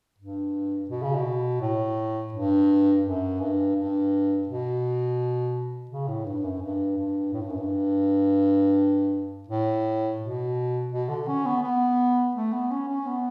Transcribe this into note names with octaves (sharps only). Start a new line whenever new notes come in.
G2
B2
C#3
B2
A2
G2
F#2
G2
G2
B2
C#3
A2
G2
F#2
G2
G2
A2
G2
F#2
G2
A2
B2
B2
D3
C#4
B3
B3
A3
B3
C#4
C#4
B3